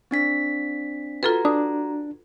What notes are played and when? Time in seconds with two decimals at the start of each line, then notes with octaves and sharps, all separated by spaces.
0.11 C4 D4 B6
1.23 F4 F#4 A4 B4 A#5
1.45 D4 D#6